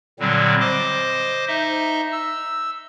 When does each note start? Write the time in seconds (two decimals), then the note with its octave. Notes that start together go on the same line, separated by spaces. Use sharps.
0.20 A#2 D3 F#3 G3 C4
0.60 C5 D#5 D6
1.48 D#4 D#5 E5
2.12 E6